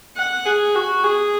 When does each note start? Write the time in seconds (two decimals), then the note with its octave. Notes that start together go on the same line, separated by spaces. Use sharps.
0.17 F#5
0.46 G#4
0.75 F#4
1.03 G#4